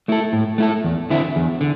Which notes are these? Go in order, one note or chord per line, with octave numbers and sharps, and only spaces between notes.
A3 E4 A4
A2
A3 E4 A4
E2
D3 C4 E4
E2
D3